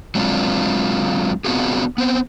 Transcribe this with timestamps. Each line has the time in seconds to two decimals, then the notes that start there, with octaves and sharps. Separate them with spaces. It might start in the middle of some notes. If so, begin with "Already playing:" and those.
0.15 F#3 G#3 C4 D4 F4
1.45 B3 C4 D4 F4 F#4 G#4
1.98 B3 C4